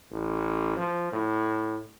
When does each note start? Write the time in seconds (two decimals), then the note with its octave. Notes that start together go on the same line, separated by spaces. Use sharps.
0.11 A1
0.77 F3
1.12 A2